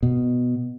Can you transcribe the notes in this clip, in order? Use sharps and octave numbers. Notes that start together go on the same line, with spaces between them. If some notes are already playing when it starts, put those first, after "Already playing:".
B2